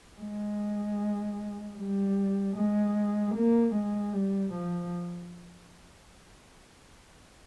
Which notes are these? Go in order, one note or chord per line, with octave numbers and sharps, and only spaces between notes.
G#3
G3
G#3
A#3
G#3
G3
F3